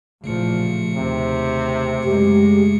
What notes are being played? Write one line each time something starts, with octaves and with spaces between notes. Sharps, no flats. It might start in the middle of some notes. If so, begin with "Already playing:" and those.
A1 A#2 C#3 F3 A3 C#7
D#2 C3
F#2 G#3 G4